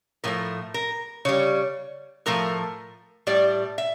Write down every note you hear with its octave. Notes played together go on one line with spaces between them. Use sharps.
A2 F3 A3 A#4
A#4
C#3 G3 C#5
A2 F3 A3 A#4
A2 G3 D5
E5